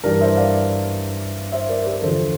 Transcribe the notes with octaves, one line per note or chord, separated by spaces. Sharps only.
G2 E3 G3 A#4 D5
C5 E5
D5 F5
C5 E5
A#4 D5
G4 A#4
E2 D3 F3 A4 C5